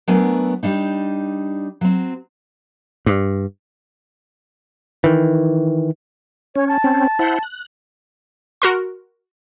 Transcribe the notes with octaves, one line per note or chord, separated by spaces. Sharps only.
F#3 A3 B3 D4 A#4 G#5
G3 D4 D#4
F#3 C4
G2
D#3 E3
C#4 C#5
A5
C4 C#4
E4 C5 F#5
F#6
F#4 A#4 C6